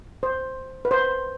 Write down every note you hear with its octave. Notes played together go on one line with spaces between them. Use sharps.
C5
B4
C5